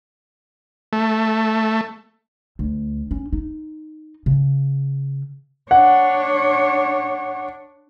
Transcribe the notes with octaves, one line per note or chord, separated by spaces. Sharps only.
A3
D2
C#4
D#4
C#3
D4 C#5 F#5